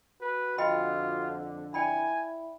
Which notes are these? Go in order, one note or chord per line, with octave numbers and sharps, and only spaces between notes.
F#4 B4
F2 D3 F4 D#5 G5 B5
E4 D5 G5 G#5 B5